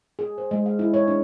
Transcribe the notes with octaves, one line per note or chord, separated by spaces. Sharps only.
G#4
C5
G#3
F5
E4
C#5
D4